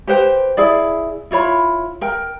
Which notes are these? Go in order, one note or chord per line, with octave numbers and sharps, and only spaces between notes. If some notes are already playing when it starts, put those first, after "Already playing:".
G4 B4 C5 G5
E4 G#4 D5
E4 F4 C#5 B5
A#4 G5